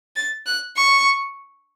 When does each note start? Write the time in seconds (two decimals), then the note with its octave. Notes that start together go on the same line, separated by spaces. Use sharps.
0.16 A6
0.46 F#6
0.77 C#6